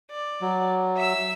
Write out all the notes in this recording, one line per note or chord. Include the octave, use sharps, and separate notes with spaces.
D5
F#3
E5 E6